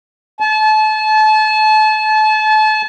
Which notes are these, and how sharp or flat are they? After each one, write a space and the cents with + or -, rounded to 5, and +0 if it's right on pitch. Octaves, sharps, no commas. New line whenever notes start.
A5 -35